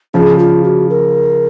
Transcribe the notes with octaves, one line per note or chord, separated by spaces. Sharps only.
C#3 F3 G#4
F4
F#4
A#4